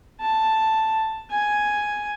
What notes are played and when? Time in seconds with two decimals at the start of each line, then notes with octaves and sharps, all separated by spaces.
0.21 A5
1.31 G#5